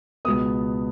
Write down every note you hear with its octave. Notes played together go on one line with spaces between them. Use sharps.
C#2 B2 B3 D#6